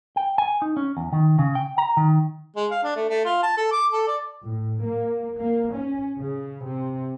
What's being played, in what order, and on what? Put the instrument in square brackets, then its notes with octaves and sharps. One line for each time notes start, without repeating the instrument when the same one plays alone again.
[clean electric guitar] G5
G#5
D#4
C#4
E2
D#3
C#3
G5
A#5
D#3
[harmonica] G#3
F5
D4
A3
A3
F4
A5
A4
D6
A4
D5
[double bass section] A2
A#3
A#3
C#4
C#3
C3